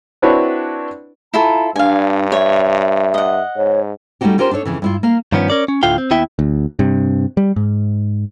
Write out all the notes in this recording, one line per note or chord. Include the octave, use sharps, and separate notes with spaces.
C4 D4 E4 F#4 B4 C#5
E4 F4 A4 A#5
G2 D4 F5 G#5
C#5 E5
E5
D#5 F#5
G#2 C#5
G3 A3 C#4 D#4 F#4 G4
C#4 F4 G4 A#4 C5
D4 D#4 A4 C#5
F2 C#3 E3
G2 E4 F4
A#3 F5
G2 D#3 F3 B3 C#4
C#4 A#4 C#5 D5
C#4
D2 A2 D3 F4 F5 G5
C4
D#2 B3 E4 E5 G5
D2
G2 C3
G3
G#2